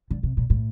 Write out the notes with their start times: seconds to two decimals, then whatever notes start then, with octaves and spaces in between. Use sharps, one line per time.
0.11 D3
0.23 C3
0.37 A#2
0.50 A2